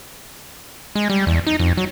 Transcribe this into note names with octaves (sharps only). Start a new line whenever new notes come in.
G#3
G3
E2
D#4
F2
F#3